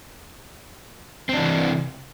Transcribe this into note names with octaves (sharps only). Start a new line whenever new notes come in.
C3 E3 C4 D4